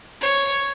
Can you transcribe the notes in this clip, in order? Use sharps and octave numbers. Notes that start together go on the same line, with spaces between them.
C#5